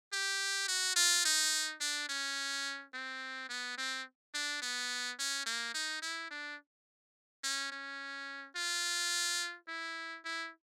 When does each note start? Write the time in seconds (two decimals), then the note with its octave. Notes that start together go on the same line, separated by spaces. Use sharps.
0.13 G4
0.68 F#4
0.96 F4
1.25 D#4
1.81 D4
2.09 C#4
2.94 C4
3.49 B3
3.78 C4
4.34 D4
4.62 B3
5.19 C#4
5.46 A#3
5.74 D#4
6.02 E4
6.30 D4
7.44 C#4
7.72 C#4
8.56 F4
9.68 E4
10.25 E4